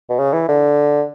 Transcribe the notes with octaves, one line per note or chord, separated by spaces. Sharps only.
B2
C#3
E3
D3